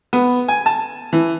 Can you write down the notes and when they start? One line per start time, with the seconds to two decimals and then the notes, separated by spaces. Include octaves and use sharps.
0.13 B3
0.48 G#5
0.66 A5
1.13 E3